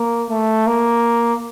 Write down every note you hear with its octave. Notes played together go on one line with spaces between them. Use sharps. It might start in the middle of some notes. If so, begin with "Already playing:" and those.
Already playing: A#3
A3
A#3